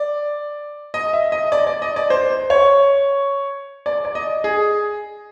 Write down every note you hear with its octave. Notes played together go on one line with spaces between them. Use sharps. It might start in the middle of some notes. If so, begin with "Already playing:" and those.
Already playing: D5
D#5
E5
D#5
D5
D5
D#5
D5
C5
C5
C#5
D5
D5
D#5
G#4